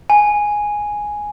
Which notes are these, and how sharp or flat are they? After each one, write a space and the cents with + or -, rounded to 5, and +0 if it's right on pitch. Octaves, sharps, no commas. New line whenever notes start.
G#5 +0